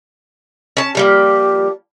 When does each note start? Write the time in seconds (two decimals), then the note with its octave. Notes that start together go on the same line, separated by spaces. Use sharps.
0.77 C#4 A5
0.95 F3 G3 A#3 G4